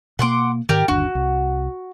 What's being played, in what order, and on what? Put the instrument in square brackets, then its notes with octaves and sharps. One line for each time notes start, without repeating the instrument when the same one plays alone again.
[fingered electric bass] B2 A#3 [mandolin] F#5 C6 D6
[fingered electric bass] G#2 D#3 [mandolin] G4 A#4 D5
[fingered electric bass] G1 D#2 D4 [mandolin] F#4
[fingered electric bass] C2